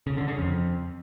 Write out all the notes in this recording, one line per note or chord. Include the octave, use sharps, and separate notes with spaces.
C#3
D3
C#3
F2